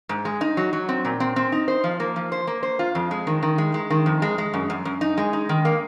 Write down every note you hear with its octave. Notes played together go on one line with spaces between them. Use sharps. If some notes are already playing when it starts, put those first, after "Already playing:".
G#2
G#3
D#4
F#3
F#3
C4
A#2
C4
C4
D#4
C5
F3
A#3
F3
C5
A#3
C5
F4
F2
G#3
D#3
D#3
G#3
G#3
D#3
F2
G#3
G#3
F#2
F#2
F#2
D#4
G#3
D#4
D#3
A#3